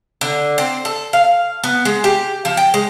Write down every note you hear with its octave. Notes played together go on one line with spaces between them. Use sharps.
D3
C4
A4
F5
B3
G#3
G4
F3
G5
G#3